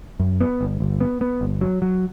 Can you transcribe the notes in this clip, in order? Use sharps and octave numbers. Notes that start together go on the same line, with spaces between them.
F#2
B3
G1
G1
B3
B3
G1
F#3
F#3